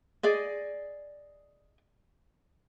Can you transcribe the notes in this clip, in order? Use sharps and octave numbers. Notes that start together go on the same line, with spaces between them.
G#4 D5 D#5